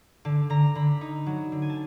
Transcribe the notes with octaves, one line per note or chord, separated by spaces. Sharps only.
D3 A5
D3 A#5
D3 B5
D#4
F#3
D3
G#5
A5